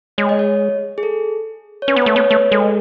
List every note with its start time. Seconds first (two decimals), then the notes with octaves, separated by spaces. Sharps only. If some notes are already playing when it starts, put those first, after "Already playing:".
0.18 G#3 C#5
0.29 D#5
0.39 C#5
0.98 G#4
1.03 A4
1.82 C#5
1.88 C#4 B4
1.96 B3
2.02 B4
2.06 A3
2.16 B3 C#5
2.30 A3 B4
2.51 G#3 A4